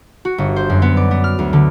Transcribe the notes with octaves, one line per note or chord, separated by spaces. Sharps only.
F#4
G1
C5
F#2
B3
D5
B3
F6
D2
D3